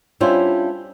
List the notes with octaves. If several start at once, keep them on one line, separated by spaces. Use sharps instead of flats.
G3 C#4 D4 E4 F4 C5